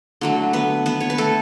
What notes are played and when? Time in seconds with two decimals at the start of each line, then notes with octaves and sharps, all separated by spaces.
0.21 D3 F#3 A3
0.53 B3 B4
0.86 B3 B4
1.01 C#5
1.10 B4
1.18 A3 A4